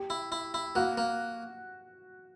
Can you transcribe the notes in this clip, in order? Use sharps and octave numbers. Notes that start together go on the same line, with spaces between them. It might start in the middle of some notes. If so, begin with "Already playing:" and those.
Already playing: G4
E4
E4
E4
A#3 F#4
A#3